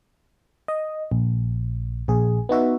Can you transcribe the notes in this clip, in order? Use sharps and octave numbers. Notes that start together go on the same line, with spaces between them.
D#5
A#1
A#1 G#4
B3 D#4 F#4 E5